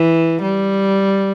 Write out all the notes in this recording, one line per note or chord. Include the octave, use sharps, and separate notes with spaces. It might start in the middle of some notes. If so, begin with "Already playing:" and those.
Already playing: E3
G3